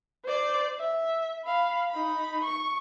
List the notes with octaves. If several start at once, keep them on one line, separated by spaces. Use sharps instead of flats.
C5 D5
E5
F5 B5
D#4 B5
C#6